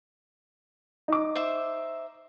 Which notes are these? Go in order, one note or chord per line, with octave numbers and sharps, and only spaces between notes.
D#4 D6
C5 E5